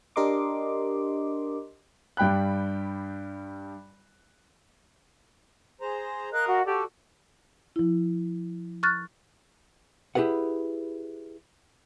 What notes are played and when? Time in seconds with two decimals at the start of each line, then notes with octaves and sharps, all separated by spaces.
0.16 D4 G4 A#4 D#5 C6 D6
2.17 G2 G3 G5 B5 F#6
5.81 G#4 C5 A#5
6.33 A#4 D#5 F5 F#6
6.47 F#4
6.66 F#4 G4 A4 D5
7.76 F3 E4
8.83 C#6 F6 F#6 A6
10.15 E4 G4 G#4 B4 F#5